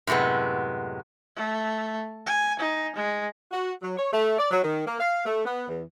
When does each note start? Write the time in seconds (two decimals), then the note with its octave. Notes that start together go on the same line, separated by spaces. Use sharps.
0.07 F#2 A2 C3 G#3 B3
1.36 A3
2.26 G#5
2.59 D#4
2.95 G#3
3.51 F#4
3.82 F#3
3.97 C#5
4.13 A3
4.38 D5
4.51 F#3
4.63 D#3
4.87 A#3
5.00 F5
5.26 A3
5.46 B3
5.68 E2